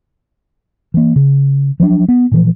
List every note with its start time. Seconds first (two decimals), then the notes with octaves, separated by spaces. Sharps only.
0.94 E3 A#3
1.16 C#3
1.80 F3 F#3 A3 D4
2.08 B3
2.32 A#2 E3 F3